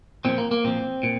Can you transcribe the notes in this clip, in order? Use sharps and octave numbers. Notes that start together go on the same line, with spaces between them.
A#2 F3 C4
A#3
A#3
A#2 F3 C4
A#2